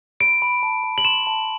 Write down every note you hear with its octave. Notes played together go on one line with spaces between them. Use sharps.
B5 D7
B5
A5
A5
F#7
C6 E7
A5